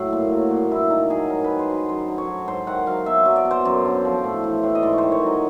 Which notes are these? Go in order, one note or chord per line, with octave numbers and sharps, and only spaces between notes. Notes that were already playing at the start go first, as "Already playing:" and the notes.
Already playing: A2 F#3
A#2
F#3
A#2
G2 E4
D#3 D#4
F#3 G#4
G#2 A#4
B4
D#3
C5
F#3
B4
F#2 C5
D3
C#5
F#3
G#2 C5
D#3 F#5
F#3 F5
B2 E5
F#3
D5
B2
C5
F#2
D3
F3
A2
E3
A2
D#5
G#2 D5
C#5
D#3 C5
C#5
F#3 D#5